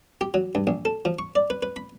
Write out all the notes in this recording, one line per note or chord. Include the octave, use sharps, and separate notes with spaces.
G4
F#3
G2
A#1
A4
F3
C#6
D5
B4
B4
B5